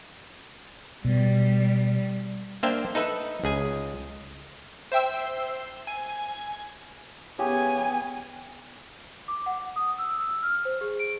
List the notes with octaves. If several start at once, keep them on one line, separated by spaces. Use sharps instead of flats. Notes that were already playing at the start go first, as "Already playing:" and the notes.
B2 G3
A#3 D4 C5 E5 F5 G5
D#4 A4 B4 E5
C#2 G#4 G#5
C5 E5 G5 E6
G#5
C#3 B3 G4 G#5
D6
F#5
D#6
E6
E6
F6
C5
G#4
D7